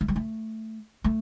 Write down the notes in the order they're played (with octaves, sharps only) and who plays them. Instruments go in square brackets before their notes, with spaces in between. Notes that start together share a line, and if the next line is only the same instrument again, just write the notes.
[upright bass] A3
G3
A3
A3